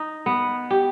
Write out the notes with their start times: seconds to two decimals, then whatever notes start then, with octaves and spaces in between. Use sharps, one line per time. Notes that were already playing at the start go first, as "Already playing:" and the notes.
Already playing: D#4
0.26 B3
0.71 G4